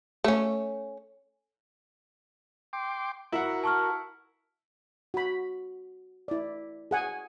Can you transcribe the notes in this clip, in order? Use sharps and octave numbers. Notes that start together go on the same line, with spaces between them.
A3 C#4
G5 C6 D6
E4 F#4 A#4 F#5
A5 C#6 F6
F#4 B5
E4 D5
G#4 F#5 G#5